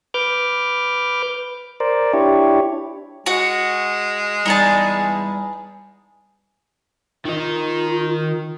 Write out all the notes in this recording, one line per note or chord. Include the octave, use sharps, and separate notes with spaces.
B4 D6 F6 G6
A#4 C5 D5
D4 E4 G4 C#5
G#3 F#4 F#5
E2 G3 D#4 G#4 A5
D#3 D#4 F4